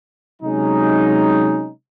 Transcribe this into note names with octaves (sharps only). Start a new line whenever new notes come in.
C3 F#3 G#3 C#4 D#4